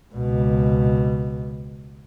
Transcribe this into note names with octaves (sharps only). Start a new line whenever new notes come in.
C#2 B2